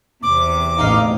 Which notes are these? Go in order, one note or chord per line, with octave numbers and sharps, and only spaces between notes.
E2 C3 D6
A1 D#4 F5